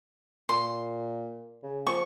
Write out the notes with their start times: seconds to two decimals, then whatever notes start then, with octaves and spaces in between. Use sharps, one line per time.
0.49 A#2 C6
1.63 C#3
1.87 F3 C#6